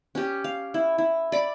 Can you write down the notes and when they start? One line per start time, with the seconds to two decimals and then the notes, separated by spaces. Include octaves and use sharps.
0.15 C#4 G4
0.44 F5
0.74 E4
0.98 E4
1.32 D5 B5 D6